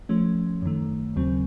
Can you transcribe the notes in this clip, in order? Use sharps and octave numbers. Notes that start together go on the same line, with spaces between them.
F3 A3 C#4
F#2 D#3 A3
D#2 C#3 F#3 C4